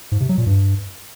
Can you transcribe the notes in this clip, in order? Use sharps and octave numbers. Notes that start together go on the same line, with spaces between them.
G#2
C3
F#3
A#2
G2